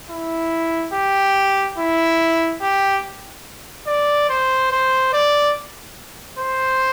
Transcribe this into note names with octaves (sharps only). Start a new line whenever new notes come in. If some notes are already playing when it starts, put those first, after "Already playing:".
E4
G4
E4
G4
D5
C5
C5
D5
C5